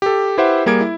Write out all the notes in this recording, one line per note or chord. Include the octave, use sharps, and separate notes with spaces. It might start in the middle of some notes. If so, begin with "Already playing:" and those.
G4 A4
E4 G4 B4 C5 E5 F#5
G3 A#3 G#4 G#6 D7
E4